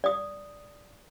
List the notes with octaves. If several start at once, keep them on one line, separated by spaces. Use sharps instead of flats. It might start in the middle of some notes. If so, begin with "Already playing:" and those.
D5 D#6